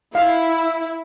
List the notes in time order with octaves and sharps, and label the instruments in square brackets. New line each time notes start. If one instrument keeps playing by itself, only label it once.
[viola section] E4 [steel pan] F5